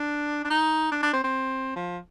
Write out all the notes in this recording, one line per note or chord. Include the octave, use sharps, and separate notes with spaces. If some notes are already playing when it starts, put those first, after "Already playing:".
Already playing: D4
D4
D#4
D4
D4
C4
C4
F3